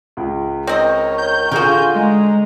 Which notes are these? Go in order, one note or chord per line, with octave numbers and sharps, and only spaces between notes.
C#2
C4 A#4 C#5 D#5
G6
D3 F4 F#4 G#4 A#4 G#5
G#3 G#5 A#5